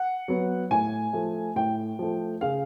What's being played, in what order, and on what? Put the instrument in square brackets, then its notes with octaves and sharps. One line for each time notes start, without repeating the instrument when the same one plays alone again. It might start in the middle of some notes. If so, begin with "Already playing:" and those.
Already playing: [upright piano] F#5
F#3 B3
A2 G#5
F3 A3
A2 G5
F3 A3
C#3 F5